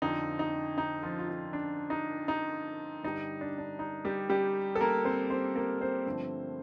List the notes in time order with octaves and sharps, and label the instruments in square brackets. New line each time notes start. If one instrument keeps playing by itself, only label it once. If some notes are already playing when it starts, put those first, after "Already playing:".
[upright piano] F2 D3 F3 D#4
D#4
D#4
F3 F4
F4
D#4
D4
D#4
D#4
G2 D3 G3 D#4
D4
D4
D#4
G3 G4
G3 G4
A4
A#3 A#4
C4 C5
C4 C5
A#3 A#4
C4 C5
G2 D3 F3 A3